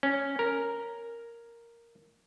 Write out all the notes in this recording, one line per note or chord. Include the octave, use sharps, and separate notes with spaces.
C#4
A#4